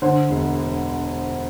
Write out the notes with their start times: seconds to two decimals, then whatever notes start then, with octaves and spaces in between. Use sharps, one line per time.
0.02 D3 C5
0.30 E1